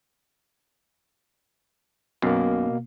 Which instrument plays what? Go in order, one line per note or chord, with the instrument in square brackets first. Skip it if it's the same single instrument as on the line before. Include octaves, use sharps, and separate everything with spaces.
[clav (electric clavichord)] B1 F#2 [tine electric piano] B2 A#3